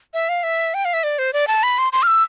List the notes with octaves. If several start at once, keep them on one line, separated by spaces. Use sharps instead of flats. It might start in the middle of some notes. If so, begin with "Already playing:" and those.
E5
F5
E5
G5
F5
E5
D5
C5
D5
A5
B5
C6
C6
F6
E6